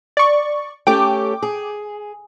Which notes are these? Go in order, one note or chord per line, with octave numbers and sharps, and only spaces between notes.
D5 C#6
A3 C#4 G4 G5 D6
G#4